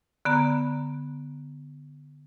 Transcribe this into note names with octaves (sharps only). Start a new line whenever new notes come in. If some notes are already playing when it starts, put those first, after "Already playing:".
D3 B3 A#5